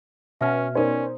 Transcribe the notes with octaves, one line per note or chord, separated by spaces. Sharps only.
B2 C#4 E5 F6
C#4 D#4 A#4 C5 D5